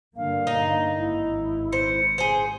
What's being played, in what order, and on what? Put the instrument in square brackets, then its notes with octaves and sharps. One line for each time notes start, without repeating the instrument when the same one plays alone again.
[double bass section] G2 D3 A#3 [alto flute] F5
[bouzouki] D#4
[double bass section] G#1 [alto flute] E4
[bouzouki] C5 [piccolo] C#7
[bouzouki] G#4 C5